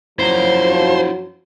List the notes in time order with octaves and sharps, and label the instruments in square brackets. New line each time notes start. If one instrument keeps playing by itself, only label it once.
[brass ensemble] F#2 F3 F#3 [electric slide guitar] E4 F#4 A#5 [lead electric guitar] C5